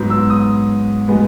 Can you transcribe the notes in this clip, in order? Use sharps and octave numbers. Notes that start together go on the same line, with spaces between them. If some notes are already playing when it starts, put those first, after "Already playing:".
Already playing: G#2 F#3 B3
E6
D#6
B2 G#3 B3